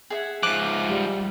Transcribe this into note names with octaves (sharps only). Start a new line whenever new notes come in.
G#4 E5 F#5
G#2 F3 D6 F#6
G3